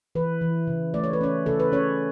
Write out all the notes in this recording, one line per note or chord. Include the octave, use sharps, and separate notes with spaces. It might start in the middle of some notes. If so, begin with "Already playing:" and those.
E3 B4
E3
C#3
A3 D5
C#5
B4
C#4 C#5
C#3 A4
B4
C#4 C#5